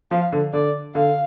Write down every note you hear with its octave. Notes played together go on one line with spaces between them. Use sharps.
F3 F5
D3
D3 D5
D3 F5